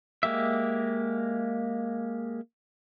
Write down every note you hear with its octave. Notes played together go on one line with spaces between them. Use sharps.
G#3 A#3 G4 E5